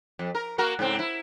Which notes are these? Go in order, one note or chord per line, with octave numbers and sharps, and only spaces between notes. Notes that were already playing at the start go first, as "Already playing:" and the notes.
F2
A#4
A#3 F#4 A#4
G#2 C#3 C4
E4